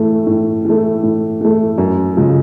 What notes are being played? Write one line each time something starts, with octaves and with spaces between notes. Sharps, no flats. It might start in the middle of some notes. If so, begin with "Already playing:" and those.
Already playing: A2 E3 A3
A2
E3 A3
A2
E3 A3
F#2
C#3 F3 G#3